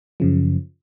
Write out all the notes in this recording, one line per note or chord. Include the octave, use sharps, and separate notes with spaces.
F#2 C#3 F3